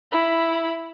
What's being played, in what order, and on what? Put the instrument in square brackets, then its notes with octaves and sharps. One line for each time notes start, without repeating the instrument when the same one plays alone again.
[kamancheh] E4 B5